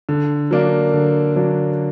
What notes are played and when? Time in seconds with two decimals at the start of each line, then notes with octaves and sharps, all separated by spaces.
0.09 D3
0.51 F#3 A#3 D4
0.93 D3
1.35 F#3 A#3 D4